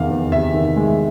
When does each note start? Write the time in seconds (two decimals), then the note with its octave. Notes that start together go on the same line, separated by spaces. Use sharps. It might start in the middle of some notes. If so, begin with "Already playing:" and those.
Already playing: E2 C3 D#3 F5 F#5
0.10 E2
0.32 C3 E5
0.54 D#3
0.76 G#3